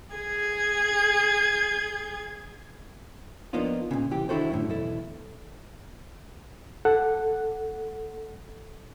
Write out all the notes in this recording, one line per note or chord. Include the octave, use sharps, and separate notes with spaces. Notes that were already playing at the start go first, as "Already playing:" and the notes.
G#4 G#6
F3 A#3 B3 D4 D#4 F4
A#2 C#3
C2 E3 G4
D#3 D4 E4 F#4 A4 C5
F#2 A2 D3
B1 E2 E4 A4
A4 F#5